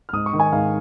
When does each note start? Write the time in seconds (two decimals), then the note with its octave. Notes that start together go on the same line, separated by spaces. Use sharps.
0.09 F6
0.13 G#2 D#6
0.26 C#6
0.33 D#3
0.40 G#5
0.52 G#2 F5